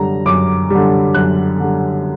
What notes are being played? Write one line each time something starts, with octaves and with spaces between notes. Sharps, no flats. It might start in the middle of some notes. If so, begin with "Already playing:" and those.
Already playing: F#2 D3 G3 A#5
F#2 D6
D3 G3
F#2 F#6
D3 G3